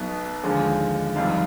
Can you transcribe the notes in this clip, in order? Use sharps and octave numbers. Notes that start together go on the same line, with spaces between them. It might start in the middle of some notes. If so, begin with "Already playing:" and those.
Already playing: B1 B2 B3
D#2 D3 F3 G#3
F1 F2 D#3 G3 F5